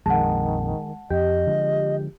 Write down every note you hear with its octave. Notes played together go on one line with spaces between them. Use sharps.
A#1 F2 D#3 G#3 F#5 A5
F2 G4 D#5
D3 F3 G#3